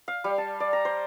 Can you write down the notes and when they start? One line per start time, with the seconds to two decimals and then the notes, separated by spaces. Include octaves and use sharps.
0.08 F5
0.24 G3
0.38 A5
0.60 D5
0.73 A#5
0.85 C5